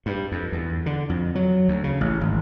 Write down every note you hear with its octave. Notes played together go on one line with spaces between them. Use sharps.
G2
F2
E2
D3
F2
F#3
D2
C#3
A1
G#1